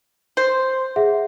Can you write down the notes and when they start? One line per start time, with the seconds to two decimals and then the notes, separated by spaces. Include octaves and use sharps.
0.37 C5
0.96 G#4 E5 F#5